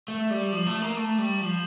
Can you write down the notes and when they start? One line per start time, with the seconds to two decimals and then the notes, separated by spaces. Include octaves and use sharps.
0.08 A3
0.30 G3
0.53 F3
0.67 A3
0.82 A#3
0.97 A3
1.18 G3
1.41 F3